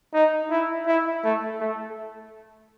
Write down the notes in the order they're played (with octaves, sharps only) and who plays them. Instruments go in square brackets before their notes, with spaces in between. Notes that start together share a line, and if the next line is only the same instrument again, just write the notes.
[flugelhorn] D#4
E4
E4
A3
A3